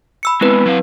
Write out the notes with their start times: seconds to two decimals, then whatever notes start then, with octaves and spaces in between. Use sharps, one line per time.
0.23 B5 E6 C#7
0.41 G#3 B3 C4 E4 B4
0.66 F#3 F5